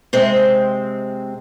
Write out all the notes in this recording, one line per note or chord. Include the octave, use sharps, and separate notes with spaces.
C3 G#3 C4